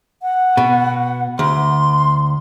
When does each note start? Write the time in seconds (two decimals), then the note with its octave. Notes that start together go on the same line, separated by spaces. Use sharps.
0.22 F#5
0.57 B2
1.39 D2 C6